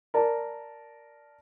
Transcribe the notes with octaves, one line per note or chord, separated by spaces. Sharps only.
A#4 D5 A5